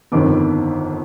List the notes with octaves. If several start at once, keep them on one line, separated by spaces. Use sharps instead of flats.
G1 F2 D#3 B3 D6